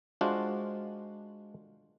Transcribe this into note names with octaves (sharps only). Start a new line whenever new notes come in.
G#3 D4 F4 F#4 C5